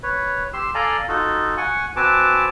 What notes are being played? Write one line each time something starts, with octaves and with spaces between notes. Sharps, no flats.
B4 C#5
G4 C6 E6
A4 D5 F5 G#5 A#5
D#4 F4 F#4 A4
F#5 G#5 C#6
C4 F#4 B4 G#5 A5 D6